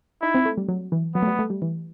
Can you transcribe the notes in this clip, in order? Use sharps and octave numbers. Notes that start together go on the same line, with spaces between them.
D#4 E4
C4
A3
G3
F#3
E3
F#3 B3
A3
G3
A3
G3
E3